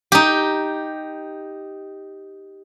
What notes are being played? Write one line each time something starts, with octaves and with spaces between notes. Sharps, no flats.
D#4 G4